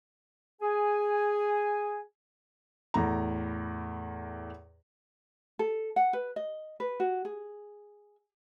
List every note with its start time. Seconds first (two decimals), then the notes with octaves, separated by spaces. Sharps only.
0.61 G#4 G#5
2.94 E2 A2 A#5
5.59 A4
5.96 F#5
6.13 B4
6.36 D#5
6.80 B4
7.00 F#4
7.25 G#4